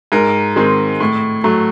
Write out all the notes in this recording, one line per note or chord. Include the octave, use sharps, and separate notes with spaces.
G#2 A#4
D#3 G#3 C4
A2
F#3 A3